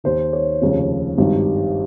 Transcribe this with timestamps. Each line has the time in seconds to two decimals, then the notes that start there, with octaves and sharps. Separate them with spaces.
0.04 D#2 D#3 C5
0.33 C#5
0.62 F1 D#2 C#3 F3
1.18 G#1 G2 D#3